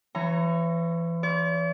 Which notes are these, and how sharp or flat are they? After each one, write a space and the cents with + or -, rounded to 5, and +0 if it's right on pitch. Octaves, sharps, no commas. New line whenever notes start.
E3 +35 C#5 +0 A#5 +0
D5 -45 C6 +25